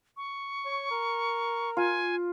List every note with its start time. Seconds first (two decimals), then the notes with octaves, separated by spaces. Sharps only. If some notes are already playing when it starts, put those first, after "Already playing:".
0.17 C#6
0.65 C#5
0.91 A#4
1.77 F4 G#5